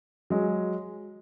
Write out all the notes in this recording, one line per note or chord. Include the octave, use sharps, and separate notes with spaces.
F#3 G#3